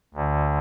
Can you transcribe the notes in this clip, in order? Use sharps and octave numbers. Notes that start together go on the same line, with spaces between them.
D2 D3